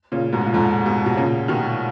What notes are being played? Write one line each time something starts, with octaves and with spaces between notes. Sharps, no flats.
A#2 C#3
G#2 B2
A#2
F2 G#2
G#2 B2
B2
A#2 C#3
B2 D#3